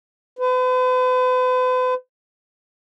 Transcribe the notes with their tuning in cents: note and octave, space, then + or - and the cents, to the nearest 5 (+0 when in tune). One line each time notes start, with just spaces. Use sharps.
B4 +45